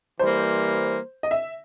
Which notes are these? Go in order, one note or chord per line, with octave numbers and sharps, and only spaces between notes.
E3 G3 A#3 C5
D#5
E5